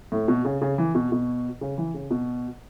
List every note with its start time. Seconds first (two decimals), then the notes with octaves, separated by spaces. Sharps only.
0.12 A2
0.28 B2
0.45 C#3
0.62 C#3
0.78 E3
0.95 B2
1.12 B2
1.61 C#3
1.78 E3
1.94 C#3
2.11 B2